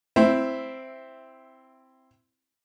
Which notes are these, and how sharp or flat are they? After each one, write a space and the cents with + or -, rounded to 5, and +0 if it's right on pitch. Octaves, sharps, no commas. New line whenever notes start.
C4 +0 E4 +10 E5 +0